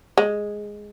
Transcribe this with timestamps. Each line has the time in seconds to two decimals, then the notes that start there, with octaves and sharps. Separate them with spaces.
0.18 G#3